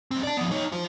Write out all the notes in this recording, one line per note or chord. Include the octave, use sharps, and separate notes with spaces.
B1 C4
D5 A5
F3 B3
D#4 C#5
F4 C5